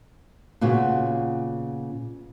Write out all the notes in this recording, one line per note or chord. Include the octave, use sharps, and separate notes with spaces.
A#2 C#3 B3 F4 F#4